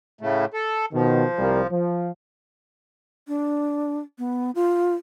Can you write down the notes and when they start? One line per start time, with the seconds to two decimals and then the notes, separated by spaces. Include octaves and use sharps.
0.21 A2 C#3 A3
0.54 A4
0.93 B2 D#3 F3
1.39 C2 G3 A#3
1.71 F3
3.28 D4
4.19 B3
4.55 F4